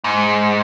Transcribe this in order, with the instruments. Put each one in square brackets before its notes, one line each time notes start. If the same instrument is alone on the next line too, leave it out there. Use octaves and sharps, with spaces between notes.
[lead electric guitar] G#2